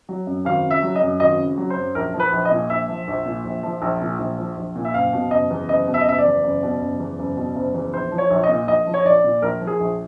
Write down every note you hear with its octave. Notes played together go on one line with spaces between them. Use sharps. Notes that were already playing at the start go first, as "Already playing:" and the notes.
F#3
F#2
G#1 F5
C#3
E5
F#3
D#5
F#2
G#1 D#5
C#3
F#3
C5
F#2
A#1 A#4
F3
B4
A#1
D#5
A#2
A#1 E5
F3
A#1
A#2
A#1
F3
A#1
A#2
A#1
F3
A#1
A#2
E5
F#1 F5
B2
F#1 D#5
E2
F#1 D#5
B2
E5
D#5
F#1 E5
D5
E2
F#1
B2
F#1
E2
F#1
B2
F#1
E2
A#1 C5
F3
C#5
A#1
D#5
A#2
A#1 D#5
F3
C#5
A#1 D5
A#2
A#1 A#4
F3
G#4
A#1